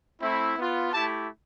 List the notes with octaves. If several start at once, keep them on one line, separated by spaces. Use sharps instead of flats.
A3 C4 E4
B3 F4
A3 E4 G4 A5